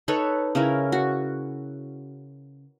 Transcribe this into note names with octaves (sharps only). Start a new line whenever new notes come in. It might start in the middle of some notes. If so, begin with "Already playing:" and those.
D#4 A4 B4 C#5
C#3 C#4 E4 A#4
F#4